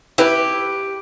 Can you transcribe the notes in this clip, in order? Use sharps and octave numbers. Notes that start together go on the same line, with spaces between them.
E4 G4 B4